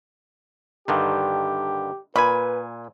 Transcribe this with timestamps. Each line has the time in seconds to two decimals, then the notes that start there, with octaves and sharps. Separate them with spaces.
0.88 G2 D3 D#3 G4
2.16 A#2 B4 G#5 B5